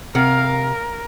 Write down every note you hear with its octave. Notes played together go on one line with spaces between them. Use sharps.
C3 A#4 F5 F#5
A#4